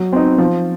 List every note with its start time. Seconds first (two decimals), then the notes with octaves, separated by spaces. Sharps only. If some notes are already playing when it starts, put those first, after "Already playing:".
Already playing: F#3
0.13 C4 D#4
0.38 F3